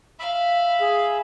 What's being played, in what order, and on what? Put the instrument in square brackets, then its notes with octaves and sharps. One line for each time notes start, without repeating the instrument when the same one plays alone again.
[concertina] E5 B5 [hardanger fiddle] F5
[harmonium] G#4